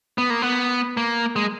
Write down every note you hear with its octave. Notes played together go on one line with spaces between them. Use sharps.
B3
A#3
B3
A#3
G#3